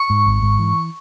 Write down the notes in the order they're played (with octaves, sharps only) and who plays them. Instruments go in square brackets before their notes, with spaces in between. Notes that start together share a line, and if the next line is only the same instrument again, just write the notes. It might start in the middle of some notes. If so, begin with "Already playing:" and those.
Already playing: [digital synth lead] C#6
[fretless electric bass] G#2
G#1
G#2
E3